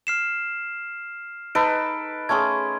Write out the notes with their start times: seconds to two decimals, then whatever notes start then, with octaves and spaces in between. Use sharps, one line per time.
0.07 F6 C7 E7
1.55 D#4 A4 B4 D7
2.29 A3 C#4 G#4 C6 G#6